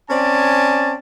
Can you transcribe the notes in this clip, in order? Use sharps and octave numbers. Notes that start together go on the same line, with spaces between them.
C4 C#4 D5 G#5 A5